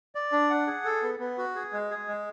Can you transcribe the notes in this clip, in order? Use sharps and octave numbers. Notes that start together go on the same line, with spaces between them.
D5
D4
F#5
G#4
A4
B3
B3
F#4
G#4
G#3
G#4
G#3